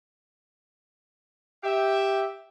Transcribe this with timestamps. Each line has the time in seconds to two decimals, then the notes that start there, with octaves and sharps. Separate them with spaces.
1.64 G4 E5